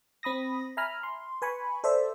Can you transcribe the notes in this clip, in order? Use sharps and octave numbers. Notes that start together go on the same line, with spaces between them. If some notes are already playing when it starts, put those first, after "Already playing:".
C4 B5 D#6 A#6
E5 G#5 A#5 B5 F6
C6
B4 G#5 B5 C#6
A4 C5 D5 E5